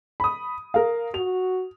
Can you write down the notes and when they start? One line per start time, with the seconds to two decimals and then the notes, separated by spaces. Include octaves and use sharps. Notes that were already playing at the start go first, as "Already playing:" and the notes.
0.20 B5 D#6
0.74 A#4 F5
1.14 F#4 F7